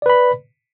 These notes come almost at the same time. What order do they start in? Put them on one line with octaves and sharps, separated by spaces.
D5 B4 B5